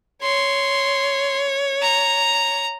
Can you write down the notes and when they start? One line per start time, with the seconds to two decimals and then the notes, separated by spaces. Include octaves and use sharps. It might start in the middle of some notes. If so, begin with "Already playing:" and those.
0.23 C#5 C6
1.82 A#5